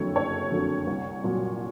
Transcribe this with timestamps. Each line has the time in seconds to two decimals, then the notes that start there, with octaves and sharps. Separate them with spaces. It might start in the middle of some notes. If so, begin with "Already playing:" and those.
Already playing: F#1 F2 D3 F#3 A3 C#5
0.15 F#1 C#5
0.52 F2 D3 F#3 A3
0.87 C2
1.24 A#2 F#3